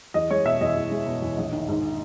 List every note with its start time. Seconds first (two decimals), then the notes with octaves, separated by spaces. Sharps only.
0.14 E2 D#5
0.31 G#3 C#5
0.45 B2 E5
0.61 E2 D#5
0.76 E2
0.91 G#3
1.07 B2
1.22 E2
1.38 A#1
1.52 D#3
1.68 G#2